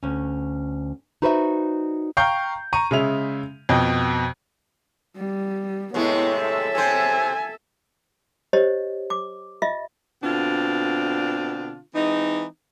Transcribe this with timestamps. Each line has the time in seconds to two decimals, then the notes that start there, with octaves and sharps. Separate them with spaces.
0.03 D2 C#4
1.22 D#4 F#4 B4 C5 D5 E5
2.17 F5 G5 A#5 C#6 G6
2.73 A#5 C#6 D#7
2.91 C#3 G#3 E5 F7
3.69 F2 B2 D#5 G5
5.17 G3
5.94 A2 C3 G#3 B3 E4 C#5
6.33 A4 E5
6.75 C3 C4 C5 G#5
8.53 G4 C5 C#5 D#5
9.10 D6
9.62 F4 D#5 E5
10.23 B2 D3 C4 D4 F4
11.95 E3 G#3 C4 D#4